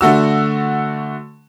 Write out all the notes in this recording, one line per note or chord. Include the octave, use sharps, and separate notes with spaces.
D3 A3 F#4 E6